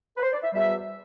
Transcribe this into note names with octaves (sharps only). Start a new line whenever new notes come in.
B4
C5
D5
E5
E2 B2 G3 E5